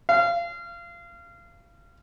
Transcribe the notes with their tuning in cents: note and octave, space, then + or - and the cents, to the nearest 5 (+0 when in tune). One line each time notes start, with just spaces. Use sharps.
F5 -25